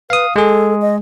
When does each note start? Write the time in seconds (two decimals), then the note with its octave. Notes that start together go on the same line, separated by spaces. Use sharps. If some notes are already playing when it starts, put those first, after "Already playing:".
0.10 B4 F5 D#6
0.36 G#3 G#4 A4
0.82 D#5